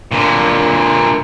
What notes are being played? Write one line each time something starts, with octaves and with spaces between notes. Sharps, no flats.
A#2 D3